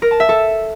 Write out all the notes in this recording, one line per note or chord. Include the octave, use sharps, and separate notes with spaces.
A#4
A5
E5
A4